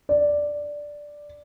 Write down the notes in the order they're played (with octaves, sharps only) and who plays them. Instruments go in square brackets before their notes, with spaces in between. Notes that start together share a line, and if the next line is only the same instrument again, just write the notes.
[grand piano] D5